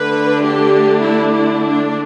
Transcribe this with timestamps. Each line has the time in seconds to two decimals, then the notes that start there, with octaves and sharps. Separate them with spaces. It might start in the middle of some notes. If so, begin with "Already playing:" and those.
Already playing: D3 A3 D4 B4
0.43 G4
1.02 E4
1.32 E4
1.62 D4